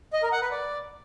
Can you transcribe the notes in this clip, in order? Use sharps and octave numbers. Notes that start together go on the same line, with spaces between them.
D#5
A#4
F#5
B4
D5